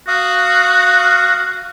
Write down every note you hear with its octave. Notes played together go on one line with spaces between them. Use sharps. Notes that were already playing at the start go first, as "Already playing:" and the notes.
F#4 F5 D#6